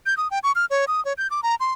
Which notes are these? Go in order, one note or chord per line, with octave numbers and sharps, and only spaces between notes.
G6
D#6
G5
C#6
F6
C#5
D#6
C#5
G6
D6
A#5
C6